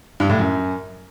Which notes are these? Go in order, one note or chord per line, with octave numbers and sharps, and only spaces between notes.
G2
A2
F#2